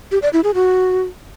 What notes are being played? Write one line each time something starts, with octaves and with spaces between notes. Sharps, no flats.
G4
D5
E4
G#4
F#4